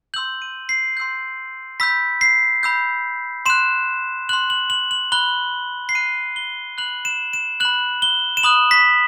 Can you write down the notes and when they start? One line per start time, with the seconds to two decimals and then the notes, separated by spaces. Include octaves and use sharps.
0.14 C6 E6 G6 F#7
0.42 D#7
0.69 C7
0.97 C6 E6 G6
1.80 B5 E6 G6 B6
2.21 C7
2.63 B5 E6 G6
3.46 C6 F#6 E7
4.29 C6 F#6 F#7
4.50 F#7
4.70 F#7
4.91 F#7
5.12 B5 F#6 G7
5.89 C7
5.95 B5 F#6 D#7
6.36 G7
6.78 B5 F#6 F#7
7.05 E7
7.33 E7
7.60 B5 F#6 F#7
8.02 G7
8.37 E7
8.43 B5 D#6 F#6 F#7
8.71 B6